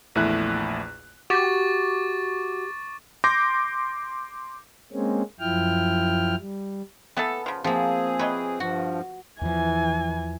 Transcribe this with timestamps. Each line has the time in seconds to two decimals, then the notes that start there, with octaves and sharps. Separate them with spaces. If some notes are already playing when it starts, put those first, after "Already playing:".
0.15 A#1 E2 A3 E4 F#6
1.30 F#4 G4 C#6 D6 A6
3.24 C6 D6 G6 A#6
4.92 G#3 A#3 C4 C#4
5.40 F#2 F3 E4 G5 F6
6.38 G3
7.17 E3 A3 B3 A4 A5
7.46 C#3 F3
7.64 C3 F3 A#3 C4 G#4
8.19 C3 B4 C#5 D#5
8.60 G2 F3 F#4
9.41 E2 E3 F3 G#5